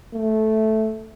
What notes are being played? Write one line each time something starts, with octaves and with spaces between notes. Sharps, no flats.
A3